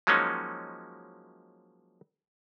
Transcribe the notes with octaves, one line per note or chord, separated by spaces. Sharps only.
F3 F#3 G#3 A#3 C#4 D#4